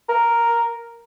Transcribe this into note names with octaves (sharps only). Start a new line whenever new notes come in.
A#4